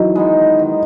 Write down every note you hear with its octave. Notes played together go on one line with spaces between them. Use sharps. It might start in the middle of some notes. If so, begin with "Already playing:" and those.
Already playing: D#3 E3 F#3
G#3 B3 D#4
D#3